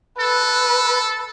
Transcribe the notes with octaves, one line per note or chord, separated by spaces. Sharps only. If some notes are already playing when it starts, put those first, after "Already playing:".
A4 B4